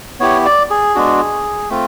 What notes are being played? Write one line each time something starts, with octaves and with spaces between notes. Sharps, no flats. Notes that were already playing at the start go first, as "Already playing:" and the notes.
B3 E4 G4 C#5
D5
G#4
G#3 B3 D4 F#4
A3 C4 F4